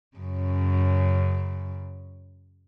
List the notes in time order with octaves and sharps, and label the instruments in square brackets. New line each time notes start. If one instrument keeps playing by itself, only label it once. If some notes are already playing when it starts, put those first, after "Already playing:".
[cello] F#2 C#3